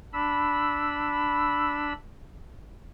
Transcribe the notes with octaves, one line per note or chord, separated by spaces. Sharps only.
D4 B5 E6